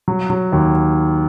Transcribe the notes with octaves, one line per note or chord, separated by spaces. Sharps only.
F#3
F#3
D#2